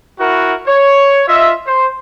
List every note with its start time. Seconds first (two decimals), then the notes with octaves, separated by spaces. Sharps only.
0.19 E4 F#4 A#4 F#5
0.67 C#5
1.27 F4 D#5 E5
1.66 C5